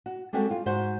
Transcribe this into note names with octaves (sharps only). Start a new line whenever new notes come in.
F#4
G3 G#3 C4 F#4 G4 A4
F4
G#2 F#4 C5